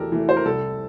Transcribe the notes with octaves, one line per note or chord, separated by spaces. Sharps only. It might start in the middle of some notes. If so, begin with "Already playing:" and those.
Already playing: E2 E3 A3 G4 A4 A#4
E3 A3
C5
A#4
C2 A4